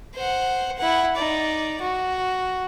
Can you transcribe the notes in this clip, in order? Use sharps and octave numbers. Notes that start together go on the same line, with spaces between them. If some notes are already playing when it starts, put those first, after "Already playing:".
C5 F#5
E4 F#5
D#4 D5
F#4